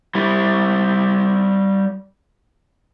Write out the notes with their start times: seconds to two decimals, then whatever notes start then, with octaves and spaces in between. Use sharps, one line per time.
0.15 G3 E4